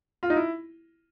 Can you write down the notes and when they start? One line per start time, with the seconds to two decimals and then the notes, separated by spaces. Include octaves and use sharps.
0.23 F4
0.30 D#4
0.36 E4